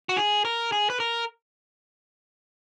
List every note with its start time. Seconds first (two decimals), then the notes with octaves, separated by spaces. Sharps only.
0.09 F#4
0.16 G#4
0.45 A#4
0.72 G#4
0.90 B4
1.00 A#4